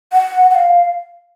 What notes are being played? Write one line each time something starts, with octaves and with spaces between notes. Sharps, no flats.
F#5
F#5
F5